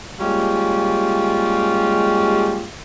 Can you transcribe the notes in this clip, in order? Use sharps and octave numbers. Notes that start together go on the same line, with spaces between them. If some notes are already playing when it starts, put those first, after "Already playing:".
G3 G#3 A#3 C#4 F4 G4